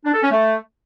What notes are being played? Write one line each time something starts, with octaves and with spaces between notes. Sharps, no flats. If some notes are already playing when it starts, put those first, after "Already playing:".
D4
A4
C#4
A3